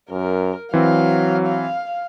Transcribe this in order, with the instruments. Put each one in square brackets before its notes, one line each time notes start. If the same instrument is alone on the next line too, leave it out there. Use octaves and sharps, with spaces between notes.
[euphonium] F#2 [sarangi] A#4
[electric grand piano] E3 C4 [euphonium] F#3 [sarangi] F5
[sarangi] F5